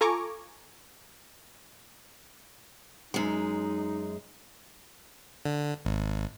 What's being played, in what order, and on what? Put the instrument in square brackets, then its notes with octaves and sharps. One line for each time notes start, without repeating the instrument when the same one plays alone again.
[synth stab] F4 A4 G#5 A#5 C#6 D6
[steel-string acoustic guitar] F#2 G#3 [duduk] D#4
[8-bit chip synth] D3
G#1